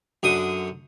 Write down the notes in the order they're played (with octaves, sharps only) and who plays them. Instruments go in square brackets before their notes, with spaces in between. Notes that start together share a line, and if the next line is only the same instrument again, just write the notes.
[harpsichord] F#2 D3 D#6